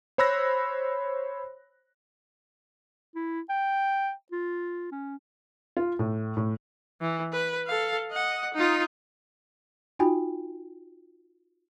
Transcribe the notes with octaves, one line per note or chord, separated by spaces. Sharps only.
C5 C#5 B5 E6 F#6 A#6
E4
G5
F4
C#4
F4
A2
A2
E3
B4
A4 F5
D#5 F#5
D#4 F4
D#4 F4 F#4 G5 G#5 B5